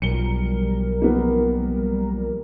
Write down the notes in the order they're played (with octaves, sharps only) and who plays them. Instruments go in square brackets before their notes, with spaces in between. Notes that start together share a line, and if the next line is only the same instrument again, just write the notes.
[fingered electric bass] B1 [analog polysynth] F3 G3 A#4 [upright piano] C#7 G7
[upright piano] A#3 B3